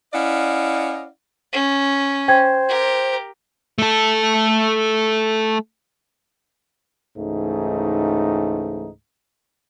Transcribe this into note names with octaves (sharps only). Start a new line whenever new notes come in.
C#4 E4 D5 D#5 F5 F#5
C#4
C5 G5 G#6
G4 A#4
A3 A4
C#2 G#2 E3 A3 D#4